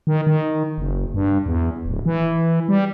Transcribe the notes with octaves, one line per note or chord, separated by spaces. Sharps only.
D#3
D#3
F#1
G2
E2
D1
E3
G3